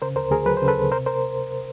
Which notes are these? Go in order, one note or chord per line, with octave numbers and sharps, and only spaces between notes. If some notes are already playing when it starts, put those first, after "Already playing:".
C#3 A#4 C5
D2 A#4 C5
D2 G#4 A#4
F#3 B4
C#3 C5
A4 B4
D2
C3 A#4 C5
A#4 C5